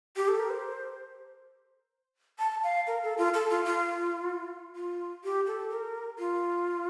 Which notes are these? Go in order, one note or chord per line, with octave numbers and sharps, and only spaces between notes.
G4
A4
A#4
C5
A5
F5
A#4
A4
F4
A4
F4
F4
F4
G4
A4
A#4
F4